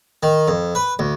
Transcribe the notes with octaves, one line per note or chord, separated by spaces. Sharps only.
D#3
F2
B4
D2